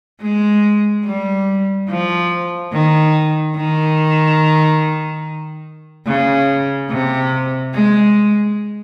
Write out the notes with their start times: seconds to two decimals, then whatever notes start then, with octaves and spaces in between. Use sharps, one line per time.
0.22 G#3
1.05 G3
1.89 F3
2.72 D#3
3.56 D#3
6.07 C#3
6.91 C3
7.74 G#3